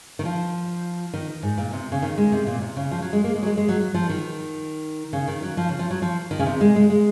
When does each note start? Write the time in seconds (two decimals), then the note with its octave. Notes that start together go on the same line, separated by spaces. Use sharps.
0.19 D#3
0.25 F3
1.14 D#3
1.43 G#2
1.58 A#2
1.73 C3
1.92 C#3
2.02 D#3
2.18 G#3
2.32 C3
2.47 A#2
2.61 C3
2.76 C#3
2.91 F3
3.02 F#3
3.13 G#3
3.24 A#3
3.36 G#3
3.43 F#3
3.46 G#3
3.58 G#3
3.69 F#3
3.80 F#3
3.94 F3
4.09 D#3
5.13 C#3
5.28 D#3
5.43 F#3
5.57 F3
5.69 C#3
5.79 F3
5.90 F#3
6.02 F3
6.31 D#3
6.39 C#3
6.46 C3
6.61 G#3
6.76 G#3
6.90 G#3